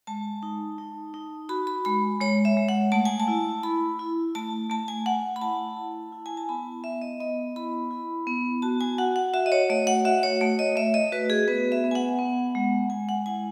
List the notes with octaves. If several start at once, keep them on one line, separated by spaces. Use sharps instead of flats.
G#3 A5
D#4
D#4
D#4
F#4 B5
B5
G#3 B5
G#3 C#5
E5
G#3
F#5
A3 A5
G#5
A5
E4
E4 B5
E4
A3 A5
A3 A5
G#5
A3 F#5
B5
E4 A5
E4
E4
G#5
A5
B3 B5
B3 E5
D#5
B3 D#5
E4 B5
E4
B3
F#4 A5
G#5
F#4 F#5
F#5
F#4 E5
D#5
C#5
A3 D#5
F#5
F#4 E5
C#5
A3 C#5
D#5
A3 E5
D#5
F#4 B4
G#4
B3 B4
E5
B3
G#5
F#5
B3
G#3
G#3 G#5
F#5
E4 G#5